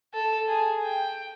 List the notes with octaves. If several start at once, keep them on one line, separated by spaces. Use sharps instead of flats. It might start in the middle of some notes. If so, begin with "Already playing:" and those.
A4
G#4
G5